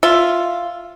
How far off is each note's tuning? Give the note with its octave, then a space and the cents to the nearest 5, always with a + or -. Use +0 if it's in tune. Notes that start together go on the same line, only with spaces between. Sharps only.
F4 +0 E5 +10